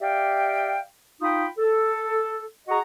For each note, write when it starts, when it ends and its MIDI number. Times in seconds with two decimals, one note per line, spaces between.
0.01 0.79 67
0.01 0.79 74
0.01 0.79 76
0.01 0.79 77
0.01 0.79 79
1.21 1.45 63
1.21 1.45 65
1.21 1.45 77
1.21 1.45 79
1.21 1.45 83
1.21 1.45 87
1.58 2.43 69
2.68 2.78 66
2.68 2.78 68
2.68 2.78 75
2.68 2.78 78
2.68 2.78 82
2.68 2.78 85